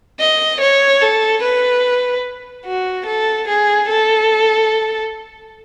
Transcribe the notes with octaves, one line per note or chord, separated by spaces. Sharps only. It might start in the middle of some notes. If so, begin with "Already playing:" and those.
D#5
C#5
A4
B4
F#4
A4
G#4
A4